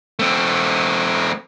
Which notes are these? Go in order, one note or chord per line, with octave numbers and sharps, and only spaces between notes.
A3 C4